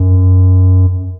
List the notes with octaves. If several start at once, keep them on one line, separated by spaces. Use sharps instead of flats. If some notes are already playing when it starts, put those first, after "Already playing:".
Already playing: F#2